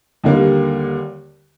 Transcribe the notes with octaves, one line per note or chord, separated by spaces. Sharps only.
D#2 D3 G3 A#3